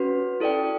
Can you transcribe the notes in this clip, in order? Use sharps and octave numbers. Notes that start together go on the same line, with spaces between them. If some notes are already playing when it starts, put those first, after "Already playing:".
Already playing: C#4 F#4 B4
E4 A4 D5 G5